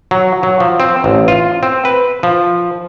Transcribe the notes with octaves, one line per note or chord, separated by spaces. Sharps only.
F#3
F#3
F3
C4
A1
F4
C4
B4
F3